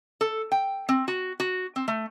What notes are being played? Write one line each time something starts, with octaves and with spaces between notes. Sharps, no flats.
A4
G5
C4
F#4
F#4
C4
A3